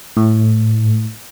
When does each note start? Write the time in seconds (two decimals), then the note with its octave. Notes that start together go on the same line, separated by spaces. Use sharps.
0.17 A2